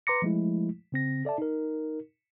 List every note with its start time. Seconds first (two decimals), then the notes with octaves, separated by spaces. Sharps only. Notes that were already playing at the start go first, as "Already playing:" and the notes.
0.07 B4 A#5 C6 D6 A#6 C#7
0.22 F3 G#3 A3 E4
0.92 C#3 C4 A#6
1.25 A4 D5 E5 A5
1.38 D#4 A#4